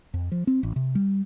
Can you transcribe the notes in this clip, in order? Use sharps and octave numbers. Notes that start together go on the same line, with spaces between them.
F2
F3
C4
A1
C3
G3